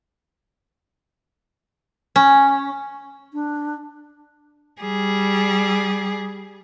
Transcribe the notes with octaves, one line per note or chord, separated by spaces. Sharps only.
C#4
D4
G3 G#4